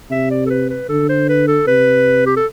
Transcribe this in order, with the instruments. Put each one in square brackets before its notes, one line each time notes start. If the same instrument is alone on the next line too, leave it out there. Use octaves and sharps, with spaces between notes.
[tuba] C3 [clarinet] E5
[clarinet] D5
A4
B4
B4
[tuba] D3 [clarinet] A4
[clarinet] C5
B4
A4
[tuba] C3 [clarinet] B4
[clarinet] G4
A4